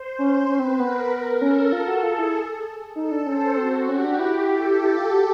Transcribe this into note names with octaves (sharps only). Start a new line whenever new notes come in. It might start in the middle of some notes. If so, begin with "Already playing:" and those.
Already playing: C5
C#4
C#4 B4
C4
C4
B3 A#4
A#4
C#4 A4
F4
F#4
F4 G#4
E4
D#4 A4
D4
C#4 C5
C4 F#4
C#4 G4
D4
E4
A4
E4
F4
F#4